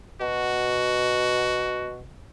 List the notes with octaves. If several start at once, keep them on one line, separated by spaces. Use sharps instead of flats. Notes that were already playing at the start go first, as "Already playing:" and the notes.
B2 F#4